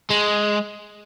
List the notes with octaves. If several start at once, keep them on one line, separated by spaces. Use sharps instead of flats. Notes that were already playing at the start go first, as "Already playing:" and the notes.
G#3